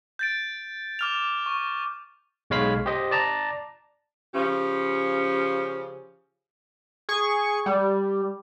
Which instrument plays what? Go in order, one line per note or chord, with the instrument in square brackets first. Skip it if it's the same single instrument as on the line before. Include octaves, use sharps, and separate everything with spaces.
[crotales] G6 A6 D7
D6 F6 F7
C#6
[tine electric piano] B1 G#3 C#5 F5 B5 B6
G4 C5 D#5
D5 A5 A#5
[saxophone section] C#3 F3 C#4 G4
[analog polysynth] G#4 C#6
G3